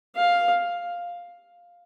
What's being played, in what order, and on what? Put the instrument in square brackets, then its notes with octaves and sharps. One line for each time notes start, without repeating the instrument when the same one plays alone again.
[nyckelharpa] F5